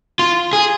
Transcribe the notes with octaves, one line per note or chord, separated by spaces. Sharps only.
F4
G#4